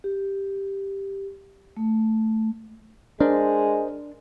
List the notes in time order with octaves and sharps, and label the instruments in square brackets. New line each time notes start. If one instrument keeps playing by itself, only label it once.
[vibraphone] G4
A3
[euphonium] G#3 [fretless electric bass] D4 [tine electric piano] A#4 C5 D#5